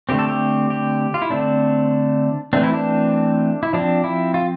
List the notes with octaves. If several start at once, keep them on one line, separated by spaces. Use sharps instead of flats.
D3 A3 C4 G4
A4
G4
G4
F4
E4
D3 A3 C4 D4
E3 A3 C4 D4
E4
D4
E4
F3 C4 D4
E4
F4